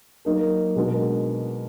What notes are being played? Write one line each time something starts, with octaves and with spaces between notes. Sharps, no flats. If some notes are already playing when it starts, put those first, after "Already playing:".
F#3 A#3 D#4 A#4
B2 G#3 D4 F#4 A#4